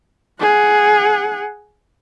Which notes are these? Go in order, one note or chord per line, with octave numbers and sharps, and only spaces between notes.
G#4 F#5